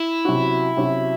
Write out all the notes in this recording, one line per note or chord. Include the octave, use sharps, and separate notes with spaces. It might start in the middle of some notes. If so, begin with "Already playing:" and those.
Already playing: E4
C3 F#3 C#4 F#4
C3 F#3 C#4 F#4